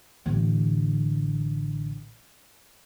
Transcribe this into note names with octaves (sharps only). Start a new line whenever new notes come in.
A1 D3